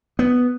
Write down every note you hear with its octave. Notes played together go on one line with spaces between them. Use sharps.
B3